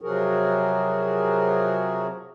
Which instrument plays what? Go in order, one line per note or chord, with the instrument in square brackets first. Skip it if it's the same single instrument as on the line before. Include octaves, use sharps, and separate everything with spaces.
[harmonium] C3 F3 F#3 F#4 G#4 A#4